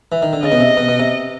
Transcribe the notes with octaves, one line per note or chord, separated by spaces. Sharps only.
E3
D#3
D3
C#3 D#5
B2
C3
B2
B2
C3